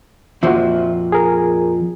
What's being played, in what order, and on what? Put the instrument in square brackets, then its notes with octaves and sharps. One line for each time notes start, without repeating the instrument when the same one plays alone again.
[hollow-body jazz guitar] F2 A#2 F3 [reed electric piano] F#4 C5 E5
[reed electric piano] G#4 A#4